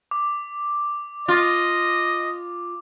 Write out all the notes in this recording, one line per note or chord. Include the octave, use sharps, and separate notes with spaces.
D6
F4 D#5